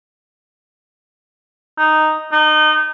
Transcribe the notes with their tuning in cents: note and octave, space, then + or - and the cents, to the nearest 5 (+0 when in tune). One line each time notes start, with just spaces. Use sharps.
D#4 -5
D#4 -25